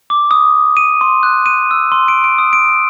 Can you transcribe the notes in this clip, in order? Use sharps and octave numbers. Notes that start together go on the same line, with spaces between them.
D6
D#6
D#7
C6
F#6
D#7
E6
C6
D7
D7
D#6
D7